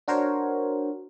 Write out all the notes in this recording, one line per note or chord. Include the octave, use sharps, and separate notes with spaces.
D4 F#4 A#4 C5 C#5